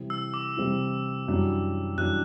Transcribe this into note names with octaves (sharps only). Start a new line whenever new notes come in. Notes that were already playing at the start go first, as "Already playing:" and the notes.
Already playing: C3 E3 G3 C4 E4
E6
D6
C3 E3 G3 C4 E4
F#2 E3 G3 D4
F#2 E3 G3 D4 F#6